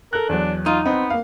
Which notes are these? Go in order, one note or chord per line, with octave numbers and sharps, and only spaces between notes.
A4 A#4 F#6
E2 F#3 D4
D#4 F4
B3 C4 D#5
A#3 F5